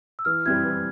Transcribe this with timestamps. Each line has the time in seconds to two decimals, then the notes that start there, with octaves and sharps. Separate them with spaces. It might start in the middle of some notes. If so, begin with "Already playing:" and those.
0.19 E6
0.25 E3 F6
0.46 G3 C4 E4 G#6
0.64 E3